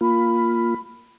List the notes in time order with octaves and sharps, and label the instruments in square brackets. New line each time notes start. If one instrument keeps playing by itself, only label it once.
[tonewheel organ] A#3 F4 [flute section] B5